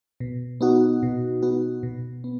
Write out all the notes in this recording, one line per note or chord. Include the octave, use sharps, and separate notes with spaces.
B2
B3 D#4 F#4
B2
B3 D#4 F#4
B2
B3